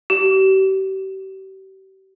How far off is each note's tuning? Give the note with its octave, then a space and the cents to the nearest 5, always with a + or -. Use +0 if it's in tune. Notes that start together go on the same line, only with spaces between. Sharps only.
G4 -40